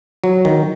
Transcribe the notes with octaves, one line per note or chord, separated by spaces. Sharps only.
F#3
D#3